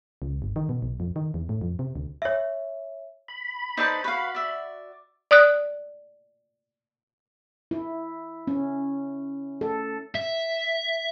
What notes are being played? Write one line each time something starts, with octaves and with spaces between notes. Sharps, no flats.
C#2
G1
D#3
B2
B1
F2
D#3
E2
A2
F2
C3
D2
C#5 E5
B5
D#4 B4 C5 D5 A5 E6
F#4 B4 F5
D5 E5
D5 D#6 F#6
E4
C#4
A4
E5